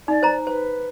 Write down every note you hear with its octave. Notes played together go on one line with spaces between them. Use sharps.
D#4 D5
C5 A#5
B4 C5